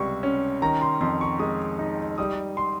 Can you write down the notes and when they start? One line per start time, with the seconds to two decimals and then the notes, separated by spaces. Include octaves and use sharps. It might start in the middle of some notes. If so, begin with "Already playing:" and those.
Already playing: C#2 C3 G3 C#6
0.23 C#4
0.62 D#3 A#5
0.82 C6
1.01 F2 C6
1.21 C#6
1.40 G#3 D#6
1.79 D#4
2.18 G3 D#6
2.57 C6